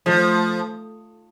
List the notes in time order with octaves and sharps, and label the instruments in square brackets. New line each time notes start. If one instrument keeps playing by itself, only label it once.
[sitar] F3 [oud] A3